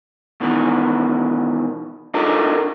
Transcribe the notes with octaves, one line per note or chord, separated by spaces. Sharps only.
B2 D#3 E3
D4 D#4 F4 A4 A#4